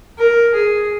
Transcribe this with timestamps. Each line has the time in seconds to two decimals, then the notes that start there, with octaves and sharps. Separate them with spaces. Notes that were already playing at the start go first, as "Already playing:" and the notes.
0.18 A#4
0.54 G#4